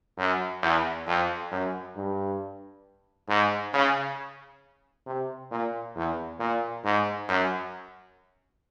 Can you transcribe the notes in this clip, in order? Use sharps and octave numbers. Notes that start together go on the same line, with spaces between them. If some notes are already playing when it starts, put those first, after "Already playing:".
F#2
E2
F2
F#2
G2
G#2
C#3
C3
A#2
E2
A#2
G#2
F#2